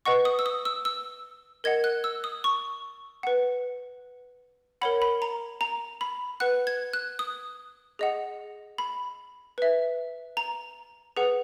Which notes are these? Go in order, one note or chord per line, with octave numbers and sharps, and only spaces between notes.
B4 D#5 F#5 C#6
D#6
E6
D#6
E6
E6
A#4 D#5 F#5 G#6
F#6
E6
D#6
C#6
B4 F#5
A#4 C#5 F#5 B5
B5
A#5
A#5
B5
B4 F#5 F#6
G#6
F#6
D#6
G#4 D#5 F#5
B5
B4 E5
A#5
G#4 B4 F#5